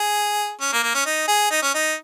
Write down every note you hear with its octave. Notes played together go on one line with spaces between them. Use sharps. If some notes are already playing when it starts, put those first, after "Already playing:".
Already playing: G#4
C#4
A#3
A#3
C#4
D#4
G#4
D#4
C#4
D#4